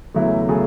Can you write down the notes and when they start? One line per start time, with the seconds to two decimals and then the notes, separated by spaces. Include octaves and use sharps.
0.14 E2 C#3 F#3 A3 E4
0.49 C#3 F#3 A3 G#4